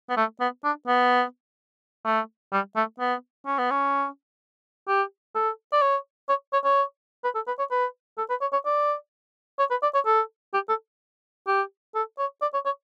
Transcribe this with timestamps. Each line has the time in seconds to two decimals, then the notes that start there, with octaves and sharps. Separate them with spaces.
0.10 B3
0.17 A3
0.41 B3
0.64 D4
0.87 B3
2.05 A3
2.53 G3
2.76 A3
3.00 B3
3.46 C#4
3.59 B3
3.71 C#4
4.88 G4
5.35 A4
5.73 D5
5.82 C#5
6.29 C#5
6.53 C#5
6.64 C#5
7.24 B4
7.35 A4
7.48 B4
7.59 C#5
7.71 B4
8.18 A4
8.30 B4
8.41 C#5
8.53 C#5
8.66 D5
9.59 C#5
9.71 B4
9.83 D5
9.95 C#5
10.06 A4
10.54 G4
10.69 A4
11.47 G4
11.95 A4
12.19 C#5
12.42 D5
12.54 C#5
12.66 C#5